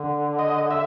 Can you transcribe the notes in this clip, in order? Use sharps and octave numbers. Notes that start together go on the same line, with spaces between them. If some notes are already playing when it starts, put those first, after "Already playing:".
Already playing: D3
D#5
E5